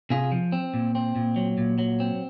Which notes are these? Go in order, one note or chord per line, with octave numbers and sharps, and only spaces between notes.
C3 F4 G#4
F3
C4
A#2
C4
A#2
F#3
A#2
F#3
C4